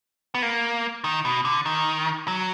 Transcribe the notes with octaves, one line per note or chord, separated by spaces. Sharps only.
B3
A#3
D#3
B2
D3
D#3
F#3